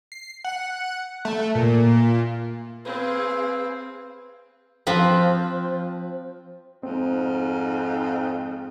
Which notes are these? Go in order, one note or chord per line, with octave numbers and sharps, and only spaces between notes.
C7
F#5
A3
A#2
C4 G#4 B4 F5
F3 C4 B4
F2 G#2 C4 D#4